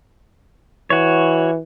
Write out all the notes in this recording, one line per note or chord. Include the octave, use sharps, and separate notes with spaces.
E3 F#4 C#5